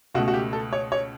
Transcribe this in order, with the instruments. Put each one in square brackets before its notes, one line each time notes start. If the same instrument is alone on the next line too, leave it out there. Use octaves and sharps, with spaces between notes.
[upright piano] C#2 B2 A3 F#4
F#4
G4
A4
C#5
C#5